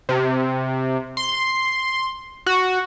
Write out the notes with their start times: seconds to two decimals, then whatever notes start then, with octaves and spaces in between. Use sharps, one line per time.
0.09 C3
1.17 C6
2.46 F#4